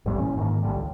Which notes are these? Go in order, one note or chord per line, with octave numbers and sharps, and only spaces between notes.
A1 G2 G3 B3
G1 A#2 E3 C#4
G#2 D#3 A#3
A1 D3 G3
C#2